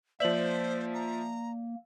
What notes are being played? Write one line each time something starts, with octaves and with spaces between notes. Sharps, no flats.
F3 A#3 C5 D5 E5 F#7
A#5